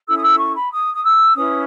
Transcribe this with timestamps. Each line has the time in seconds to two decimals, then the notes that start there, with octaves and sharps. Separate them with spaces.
0.08 C#4 E4 A4 E6
0.16 D#6
0.23 E6
0.39 C#6
0.56 B5
0.72 D#6
0.93 D#6
1.03 E6
1.35 C#4 E4 B4 D#6